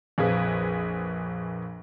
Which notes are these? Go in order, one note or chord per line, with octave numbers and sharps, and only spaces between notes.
A#1 F2 G#4 B4